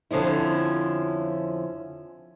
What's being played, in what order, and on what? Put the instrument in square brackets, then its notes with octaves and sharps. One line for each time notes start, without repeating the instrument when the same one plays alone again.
[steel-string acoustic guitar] F2 D3 F3 C#4 E4